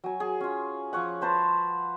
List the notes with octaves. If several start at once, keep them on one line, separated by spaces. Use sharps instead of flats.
F#3 G#5
G#4
C#4 F4
F3 C#4 C#5 F#5
B4 C5 A5 C6